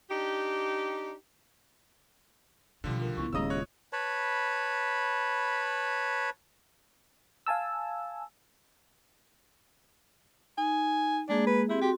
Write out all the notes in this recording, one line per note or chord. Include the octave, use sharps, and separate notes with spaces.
D4 D#4 G4
B1 D3 D#3 F3 G3
F4 A#4
C#2 B3 E4 C#6
D#1 D#2 C#3 G#3 D#5 A#5 D#6 E6
C#4 F4 C#5 F#6
B4 C#5 A5 B5
F5 G#5 A5 E6
D#4 G#5
G#3 A#3 D4 G#4
B4
C4 E4 G4 G#4
F#4 G4 C6